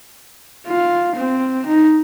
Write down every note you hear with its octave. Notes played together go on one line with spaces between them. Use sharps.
F4
C4
D#4